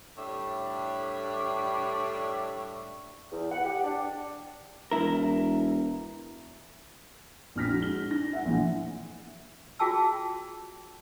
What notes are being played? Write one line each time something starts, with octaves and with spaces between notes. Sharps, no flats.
A2 G3 D4 C#5 E5
E2
F#5
G4
D4
E1 E4 A#4
A#1 F2 F6 A#6 B6
D4 F#4
G#3 G7
D4 A#6
E5 F#5
A#1 A#2 E3 G#3
F4 F#4 G#4 G5 A5 E6